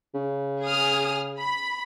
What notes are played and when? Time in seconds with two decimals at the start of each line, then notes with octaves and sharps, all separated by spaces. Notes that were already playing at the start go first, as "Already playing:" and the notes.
0.15 C#3
0.64 G#4 D#6 F6
1.39 B5